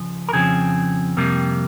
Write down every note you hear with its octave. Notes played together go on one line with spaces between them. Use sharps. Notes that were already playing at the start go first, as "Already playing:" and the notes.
Already playing: C#3 F3
A#4
F2 C#3 F3 C4 G#4
F2 C3 G3 A#3